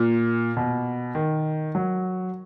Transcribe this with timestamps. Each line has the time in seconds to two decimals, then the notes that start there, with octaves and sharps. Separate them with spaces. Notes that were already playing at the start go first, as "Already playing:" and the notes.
Already playing: A#2
0.57 B2
1.15 D#3
1.75 F#3